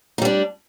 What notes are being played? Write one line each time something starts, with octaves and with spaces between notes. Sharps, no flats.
G3 D4 D#4